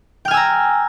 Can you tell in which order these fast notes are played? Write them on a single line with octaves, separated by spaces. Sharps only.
G5 F6 G#5 E6 A#5